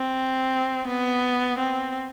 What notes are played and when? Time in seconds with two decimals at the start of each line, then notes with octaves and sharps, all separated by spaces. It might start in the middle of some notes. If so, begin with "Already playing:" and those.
Already playing: C4
0.87 B3
1.59 C4